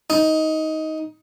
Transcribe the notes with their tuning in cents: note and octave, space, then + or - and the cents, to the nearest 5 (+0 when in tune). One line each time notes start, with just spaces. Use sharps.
D#4 +15